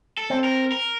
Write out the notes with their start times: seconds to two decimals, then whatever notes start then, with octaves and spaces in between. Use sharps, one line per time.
0.17 A4
0.30 C4
0.44 A#4
0.72 A#4